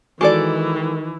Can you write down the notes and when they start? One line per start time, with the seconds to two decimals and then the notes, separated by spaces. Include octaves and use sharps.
0.21 D#3 E3 G#3 F#4 A4 D5 C#6 D6